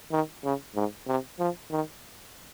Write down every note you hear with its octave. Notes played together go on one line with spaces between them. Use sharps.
D#3
C#3
G#2
C3
F3
D#3